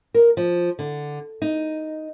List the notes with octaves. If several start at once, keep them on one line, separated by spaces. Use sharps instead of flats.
A#4
F3
D3
D#4